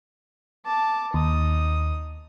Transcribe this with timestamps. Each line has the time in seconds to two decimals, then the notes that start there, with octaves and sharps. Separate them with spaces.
0.66 A5 D6
1.14 D#2 D#4 D#6